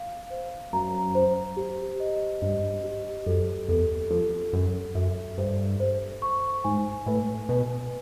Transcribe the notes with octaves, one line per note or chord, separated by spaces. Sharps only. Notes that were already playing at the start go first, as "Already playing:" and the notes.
Already playing: F5
C5
F#2 A#5
C5
G4
D#5
G2 D#5
G4
F#2 A4
E2 A4
F2 A4
F#2 A4
F#2 E5
G2 C5
C5
C#6
G#2 G#5
A2 B4
B2 B4